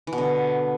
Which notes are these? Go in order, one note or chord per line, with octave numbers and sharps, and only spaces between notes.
E3
B2
D3